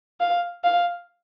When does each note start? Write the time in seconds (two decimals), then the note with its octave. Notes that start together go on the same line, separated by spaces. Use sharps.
0.20 F5
0.64 F5